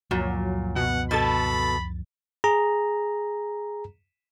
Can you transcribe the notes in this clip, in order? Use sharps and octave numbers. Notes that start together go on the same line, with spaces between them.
C#2 F#2 A#2 F3 F#3
B2 F#5
B2 A4 B5 A6
G#4 A#5